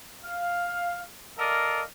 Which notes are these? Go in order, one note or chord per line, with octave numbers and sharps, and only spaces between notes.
F5
A4 A#4 D5 D#5 F5